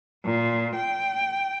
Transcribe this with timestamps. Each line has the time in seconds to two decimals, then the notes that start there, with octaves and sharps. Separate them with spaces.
0.24 A#2
0.74 G5